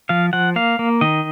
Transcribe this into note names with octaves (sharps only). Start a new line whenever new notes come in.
F3 F5
F3 F#5
A#3 F5
A#3
D#3 D#5